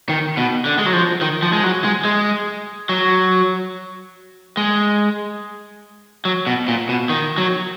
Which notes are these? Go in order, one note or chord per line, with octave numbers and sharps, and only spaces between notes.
D#3
B2
D3
G#3
F#3
F3
D#3
F3
G#3
F#3
G#3
G#3
F#3
G#3
F#3
B2
A#2
B2
D#3
F#3